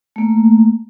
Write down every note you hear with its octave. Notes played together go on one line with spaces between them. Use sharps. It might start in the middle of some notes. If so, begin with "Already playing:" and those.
A3 A#3